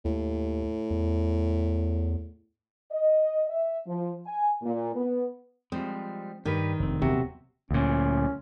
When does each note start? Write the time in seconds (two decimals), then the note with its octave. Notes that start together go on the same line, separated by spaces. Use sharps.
0.05 D#2 A2
0.90 E2
2.92 D#5
3.49 E5
3.86 F3
4.26 G#5
4.62 A#2
4.95 B3
5.72 F3 G3 G#3 C4
6.45 G2 D#3 G4 B4
6.80 F1 D2 C4
7.02 D#1 C3 F#3 B3 F#4 E5
7.71 D2 A#2 C#4